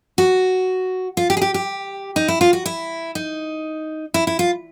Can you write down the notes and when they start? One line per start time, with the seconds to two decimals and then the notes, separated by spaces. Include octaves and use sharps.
0.18 F#4
1.17 F4
1.30 G4
1.37 G#4
1.42 G4
1.54 G4
2.16 D#4
2.28 E4
2.41 F4
2.53 F#4
2.66 E4
3.15 D#4
4.14 E4
4.27 E4
4.39 F4